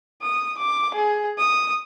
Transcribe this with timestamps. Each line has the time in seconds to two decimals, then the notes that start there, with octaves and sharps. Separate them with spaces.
0.22 D#6
0.58 D6
0.94 G#4
1.38 D#6